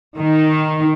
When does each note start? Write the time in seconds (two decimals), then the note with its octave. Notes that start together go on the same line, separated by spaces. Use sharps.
0.17 D#3